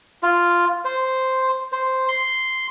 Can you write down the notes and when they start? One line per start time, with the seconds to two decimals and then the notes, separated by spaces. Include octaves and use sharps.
0.23 F4
0.85 C5
1.72 C5
2.08 C6